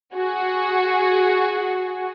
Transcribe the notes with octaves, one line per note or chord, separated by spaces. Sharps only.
F#4 G#4